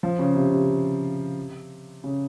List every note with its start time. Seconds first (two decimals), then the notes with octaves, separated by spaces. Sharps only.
0.03 F3
0.19 C#3
0.35 C3
0.53 C3
2.04 C#3